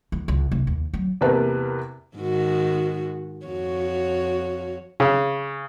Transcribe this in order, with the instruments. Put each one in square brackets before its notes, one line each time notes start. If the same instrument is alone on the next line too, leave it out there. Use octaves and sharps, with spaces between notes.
[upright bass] E2
C#2
C2
D#2
F#3
[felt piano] E2 C3 A#3 A#4 B4 A5
[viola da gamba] G#2 D#3 F#4
F2 F#4 C#5
[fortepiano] C#3